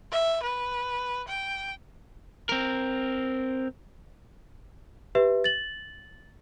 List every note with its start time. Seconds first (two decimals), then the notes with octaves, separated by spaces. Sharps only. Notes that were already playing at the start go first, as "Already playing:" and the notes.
0.12 E5
0.43 B4
1.28 G5
2.49 C4 A#4
5.15 G4 B4 E5
5.44 A6 F#7